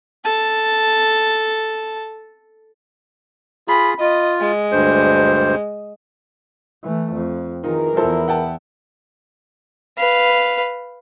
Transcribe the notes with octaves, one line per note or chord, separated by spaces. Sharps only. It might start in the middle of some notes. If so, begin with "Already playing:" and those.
A4 A5
F4 G#4 B5
F4 D#5
G#3
D2 G2 C5
E3 A3
F2
D#3 E3 D#4 F4 G#4 A#4
E2 F3 E4 A4 C5
F#5 G5 A5
B4 F5